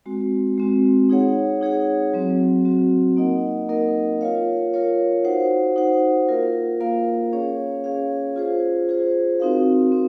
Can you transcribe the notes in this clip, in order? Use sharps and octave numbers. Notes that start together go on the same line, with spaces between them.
G#3 C4 F#4
G#3 C4 F#4
D#4 G#4 C#5 F#5
D#4 G#4 C#5 F#5
F#3 C4 F#4
F#3 C4 F#4
A#3 D#4 A#4 D#5 F#5
A#3 D#4 A#4 D#5 F#5
F4 A#4 C#5 F5
F4 A#4 C#5 F5
D#4 F#4 C5 F#5
D#4 F#4 C5 F#5
A#3 F4 A#4 F5
A#3 F4 A#4 F5
C#4 G#4 C#5 F5
C#4 G#4 C#5 F5
F4 G#4 C5
F4 G#4 C5
C4 D#4 F#4 A#4 F5
C4 D#4